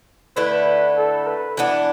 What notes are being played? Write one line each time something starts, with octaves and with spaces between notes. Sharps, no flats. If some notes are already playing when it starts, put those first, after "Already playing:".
D3 A3 E4 B4
A4
B4
E3 B3 D4